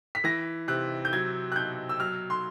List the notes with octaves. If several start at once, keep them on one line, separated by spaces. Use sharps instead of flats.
B6
E3 A#6
C3 F#6
G6
F#3 G#6
F#6
B2 G6
E6
F#3 F6
C6